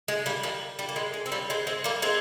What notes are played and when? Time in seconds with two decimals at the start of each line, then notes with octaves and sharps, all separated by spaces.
0.08 G#3
0.26 G3 A#3
0.43 G3 A#3
0.79 G3
0.89 A#3
0.96 G#3
1.14 G#3
1.26 C4
1.32 G3 A#3
1.50 G#3 C4
1.67 G#3 C4
1.84 G3 A#3
2.02 G#3 C4